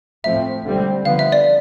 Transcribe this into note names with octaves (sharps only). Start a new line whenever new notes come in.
A2 F3 C4 E5
D3 G3 C4
D3 F3 B3 F5
E5
D5